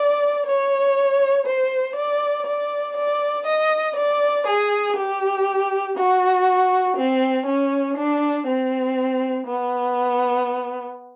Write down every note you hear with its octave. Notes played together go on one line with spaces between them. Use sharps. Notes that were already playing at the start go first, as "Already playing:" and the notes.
Already playing: D5
C#5
C5
D5
D5
D5
D#5
D5
G#4
G4
F#4
C4
C#4
D4
C4
B3